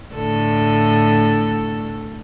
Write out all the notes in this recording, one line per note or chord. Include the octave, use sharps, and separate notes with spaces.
A2 D3 A4